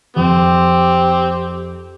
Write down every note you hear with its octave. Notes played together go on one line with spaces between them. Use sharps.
F2 C4 G4